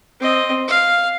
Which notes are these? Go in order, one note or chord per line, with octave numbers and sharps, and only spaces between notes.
C4 D#5
F5